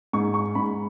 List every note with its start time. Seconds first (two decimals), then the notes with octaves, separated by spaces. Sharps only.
0.13 G#2 C#6
0.34 C#6
0.55 G#2 B5